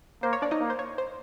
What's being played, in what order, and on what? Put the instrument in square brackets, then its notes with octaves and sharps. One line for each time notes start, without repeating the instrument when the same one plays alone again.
[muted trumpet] A#3 [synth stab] C5
[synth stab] C#5
D4 D5
D#4 D#5
[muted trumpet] A#3
[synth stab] C5
C#5
C5